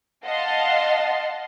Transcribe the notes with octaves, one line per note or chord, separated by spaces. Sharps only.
D#5 F5 F#5 A5 C6